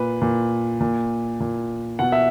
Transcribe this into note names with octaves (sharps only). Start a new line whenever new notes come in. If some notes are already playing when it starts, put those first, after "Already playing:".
Already playing: A#2 B4
A#2
A#2
A#2
B2 F#5
E5